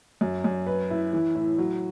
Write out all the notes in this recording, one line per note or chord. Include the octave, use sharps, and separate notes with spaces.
F#2
F#2
B4
E4
E3
A2
F#3